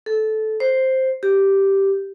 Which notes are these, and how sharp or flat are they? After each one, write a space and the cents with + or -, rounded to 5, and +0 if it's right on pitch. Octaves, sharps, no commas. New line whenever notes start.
A4 -15
C5 +5
G4 -5